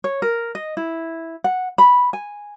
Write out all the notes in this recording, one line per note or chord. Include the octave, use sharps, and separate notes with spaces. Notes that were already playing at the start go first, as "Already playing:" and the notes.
C#5
A#4
D#5
E4
F#5
B5
G#5